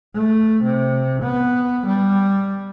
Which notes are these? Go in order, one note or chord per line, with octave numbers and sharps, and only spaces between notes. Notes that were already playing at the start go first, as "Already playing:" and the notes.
A3
C3
B3
G3